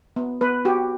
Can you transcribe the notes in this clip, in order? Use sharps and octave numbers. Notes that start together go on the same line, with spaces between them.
B3
B3 B4
F#4 G4